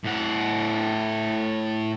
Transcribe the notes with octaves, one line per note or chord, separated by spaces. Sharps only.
A2 F#5